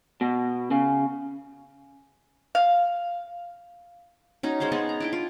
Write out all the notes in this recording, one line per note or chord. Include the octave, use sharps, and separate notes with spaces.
B2
C#3
F5
C#4 D#4 F#4
G#3 C5 C#5 F5
B3 D#4 G#4 A5
A#5
D4 E4 G5
F4